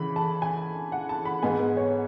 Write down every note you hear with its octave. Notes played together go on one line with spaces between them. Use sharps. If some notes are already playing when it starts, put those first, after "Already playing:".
Already playing: C#3 E3 B5
A5
G#5
F#5
A5
B5
G#2 G#3 B3 G#5
B4
C#5